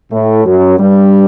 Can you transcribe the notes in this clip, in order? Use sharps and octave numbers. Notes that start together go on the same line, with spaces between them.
A2 A3
F#2 F#3
G2 G3